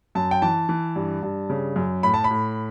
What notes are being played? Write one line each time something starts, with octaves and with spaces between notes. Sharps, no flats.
F#2 A5
G5
E3 A5
E3
G2
G2
C#3
F#2
A2 B5
A5
B5
A2